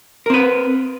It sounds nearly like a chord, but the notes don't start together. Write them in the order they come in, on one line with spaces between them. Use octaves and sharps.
A#4 C4 B4